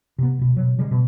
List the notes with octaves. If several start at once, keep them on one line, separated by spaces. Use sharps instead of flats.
C3 B3
D1 B2
B2 F#3
C#3 G3 G#3
B2